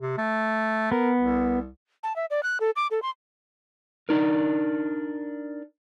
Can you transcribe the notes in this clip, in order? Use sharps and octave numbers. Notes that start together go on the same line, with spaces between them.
C3
A3
B3 A#4
C2
A5
E5
D5
F#6
A4
D6
A4
C6
D4 D#4 A#4